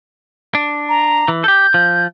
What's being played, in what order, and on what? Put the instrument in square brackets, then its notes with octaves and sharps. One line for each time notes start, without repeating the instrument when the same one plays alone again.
[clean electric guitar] D4
[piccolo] A#5
[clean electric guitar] E3
[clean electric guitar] G4 A4 [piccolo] G6
[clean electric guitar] F3